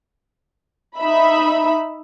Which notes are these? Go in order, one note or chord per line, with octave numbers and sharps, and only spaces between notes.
D#4 E5 B5